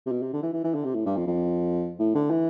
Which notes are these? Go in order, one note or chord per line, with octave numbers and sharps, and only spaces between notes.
C3
B2
C3
D3
E3
E3
E3
D3
C3
A2
G2
F2
F2
A2
D3
E3